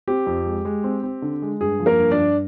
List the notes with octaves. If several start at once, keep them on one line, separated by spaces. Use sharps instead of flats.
C4 G4
F2
G#3
G#3
C4
C4
D3
G#3
G2 G#4
F3
A#3 A#4
G2
D4 D5
G2